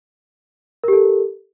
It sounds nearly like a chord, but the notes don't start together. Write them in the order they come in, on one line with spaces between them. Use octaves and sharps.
A#4 G4 A4